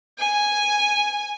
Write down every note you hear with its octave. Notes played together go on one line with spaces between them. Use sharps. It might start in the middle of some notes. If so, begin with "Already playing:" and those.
G#5